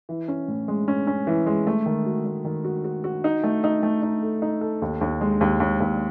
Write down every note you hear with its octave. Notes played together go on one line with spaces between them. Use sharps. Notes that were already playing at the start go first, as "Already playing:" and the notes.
E3
C#4
A2
G#3
C#4
C#4
E3
G#3
A3
D#3
F#4
A3
D#3
F#4
F#4
F#4
D#4
A3
D#4
A3
D#4
A4
D#4
A4
D#2
D#2
G#3
D#2
D#2
D#2